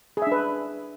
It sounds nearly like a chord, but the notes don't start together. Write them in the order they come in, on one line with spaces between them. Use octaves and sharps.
G#4 E5 D4 B4